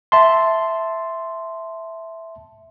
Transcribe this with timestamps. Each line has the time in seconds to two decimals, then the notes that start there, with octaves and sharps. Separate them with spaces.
0.12 E5 A5 C6